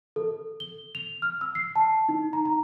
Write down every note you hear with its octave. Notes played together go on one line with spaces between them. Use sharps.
A4
G7
F7
F6
E6
C7
A5
D#4
A#5
A#5